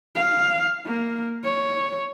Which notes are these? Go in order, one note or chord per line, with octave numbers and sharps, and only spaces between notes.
F5
A#3
C#5